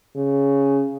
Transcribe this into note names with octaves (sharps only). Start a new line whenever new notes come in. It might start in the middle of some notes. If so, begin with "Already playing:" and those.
C#3